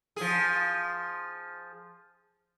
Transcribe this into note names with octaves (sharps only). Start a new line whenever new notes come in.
F3 G#4